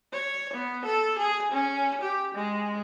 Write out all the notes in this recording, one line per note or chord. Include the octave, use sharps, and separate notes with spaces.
C#5
B3
A4
G#4
C#4
G4
G#3